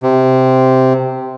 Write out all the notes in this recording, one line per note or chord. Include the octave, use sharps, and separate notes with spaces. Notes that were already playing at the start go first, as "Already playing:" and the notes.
C3